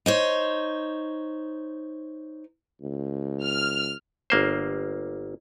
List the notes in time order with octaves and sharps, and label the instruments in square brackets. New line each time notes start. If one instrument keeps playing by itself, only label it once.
[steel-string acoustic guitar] D#4 C5 C#5
[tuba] C#2
[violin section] F6
[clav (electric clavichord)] G1 A#3 C5